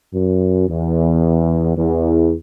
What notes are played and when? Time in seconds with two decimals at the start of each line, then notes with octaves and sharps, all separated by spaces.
0.14 F#2
0.69 E2
1.77 E2